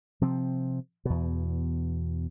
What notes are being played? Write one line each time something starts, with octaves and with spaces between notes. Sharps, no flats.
C3 F3 C4
E2 B2